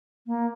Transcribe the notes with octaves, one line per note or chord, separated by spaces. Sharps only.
A#3